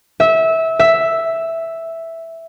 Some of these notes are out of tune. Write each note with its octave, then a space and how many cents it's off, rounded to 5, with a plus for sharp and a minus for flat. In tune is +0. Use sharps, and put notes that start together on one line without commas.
E5 -20
E5 +0